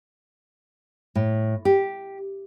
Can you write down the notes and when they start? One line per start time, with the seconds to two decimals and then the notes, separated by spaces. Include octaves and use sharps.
1.15 A2
1.65 G4